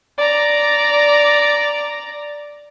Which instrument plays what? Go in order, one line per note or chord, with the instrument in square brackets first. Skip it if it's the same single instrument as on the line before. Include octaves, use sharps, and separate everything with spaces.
[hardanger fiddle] D5 A#5